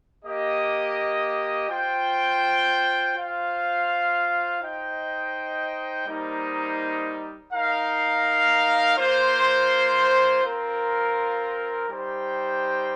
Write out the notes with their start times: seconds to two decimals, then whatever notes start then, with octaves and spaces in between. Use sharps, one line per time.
0.25 A#3 G4 D#5
1.70 F4 C5 G5
3.15 F4 C5 F5
4.61 D#4 C5 D#5 G5
6.07 G3 A#3 D#4 C5
7.53 D#4 A#4 F5
8.97 A#3 F4 C5
10.43 C4 F4 A#4 F5
11.89 G3 D#4 G4 C5 G5